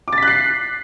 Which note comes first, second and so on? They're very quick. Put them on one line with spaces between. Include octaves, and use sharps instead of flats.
D6 A6 B6 F#6 C7